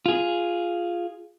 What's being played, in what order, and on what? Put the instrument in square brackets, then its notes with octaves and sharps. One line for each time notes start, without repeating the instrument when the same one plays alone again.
[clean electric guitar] F4 G#4